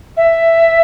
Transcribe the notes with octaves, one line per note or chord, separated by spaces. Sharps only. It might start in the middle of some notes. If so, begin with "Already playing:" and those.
E5